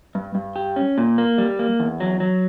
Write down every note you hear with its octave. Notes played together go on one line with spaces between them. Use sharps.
G2
G2
G4
C#4
A#2
A#3
G3
A#3
E2
F#3
F#3